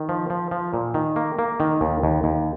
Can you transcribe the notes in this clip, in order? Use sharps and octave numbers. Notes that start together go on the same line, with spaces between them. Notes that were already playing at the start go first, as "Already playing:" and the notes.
Already playing: D#3
F3
F3
F3
A#2
D#3
A#3
A#3
D#3
D#2
D#2
D#2